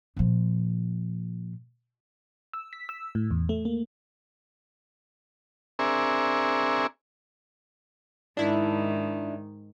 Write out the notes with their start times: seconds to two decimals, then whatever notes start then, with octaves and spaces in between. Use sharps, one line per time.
0.17 A#2 F3
2.53 E6
2.73 B6
2.89 E6
3.15 A2
3.31 E2
3.49 A3
3.65 A#3
5.79 C4 D4 G#4 A#4 E5 C#6
8.37 G#2 D#3 D4 E4